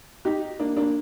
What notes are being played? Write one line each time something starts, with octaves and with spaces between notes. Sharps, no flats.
D#4 G4
A#3 D4
A#3 D4